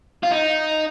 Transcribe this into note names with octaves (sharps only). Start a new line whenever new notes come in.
F4
D#4